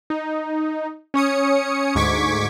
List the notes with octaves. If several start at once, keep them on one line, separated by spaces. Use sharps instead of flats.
D#4
C#4 C#5 D#6 C#7
D2 G#2 C#6 D6 G#6 B6